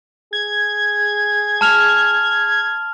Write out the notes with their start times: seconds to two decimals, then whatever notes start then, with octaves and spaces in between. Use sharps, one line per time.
0.33 G#4 G#6
1.61 A5 F6 F7